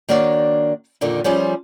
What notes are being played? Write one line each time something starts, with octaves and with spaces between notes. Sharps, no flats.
D#3 A#3 D4 F#4 C#5 D5
F2 A#2 D3 D#3
F3 G3 C#4 F4 G#4